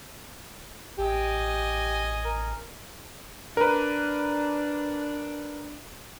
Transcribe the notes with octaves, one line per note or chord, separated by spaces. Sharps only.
A1 G4 D#5 G#5
A#4
D4 A#4 B4